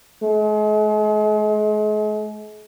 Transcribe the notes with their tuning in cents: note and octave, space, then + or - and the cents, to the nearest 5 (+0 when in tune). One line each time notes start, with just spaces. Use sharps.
G#3 +40